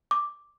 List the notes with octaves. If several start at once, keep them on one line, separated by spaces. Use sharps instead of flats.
D6